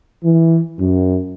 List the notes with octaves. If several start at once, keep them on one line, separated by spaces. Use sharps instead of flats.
E3
F#2